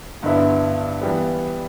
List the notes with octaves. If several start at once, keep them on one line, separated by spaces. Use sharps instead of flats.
G2 D3 B3 E4
E3 G3 B3